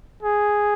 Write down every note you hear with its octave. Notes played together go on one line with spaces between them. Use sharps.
G#4